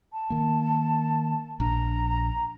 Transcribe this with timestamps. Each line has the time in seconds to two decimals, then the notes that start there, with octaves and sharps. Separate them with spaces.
0.13 A5
0.30 D#3 A#3
1.60 A#1 D4 A#5